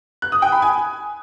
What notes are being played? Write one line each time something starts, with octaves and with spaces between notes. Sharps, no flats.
F#6
D#6
G5
B5
G#5